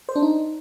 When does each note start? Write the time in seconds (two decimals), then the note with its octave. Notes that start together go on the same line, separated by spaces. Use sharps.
0.09 C5
0.16 D4
0.22 D#4